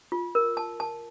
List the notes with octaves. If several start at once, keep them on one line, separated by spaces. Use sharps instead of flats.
F4
A#4
A5
A5